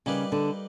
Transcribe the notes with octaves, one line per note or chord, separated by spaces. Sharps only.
C#3 G3 A#3 D#4 G4 B4
D3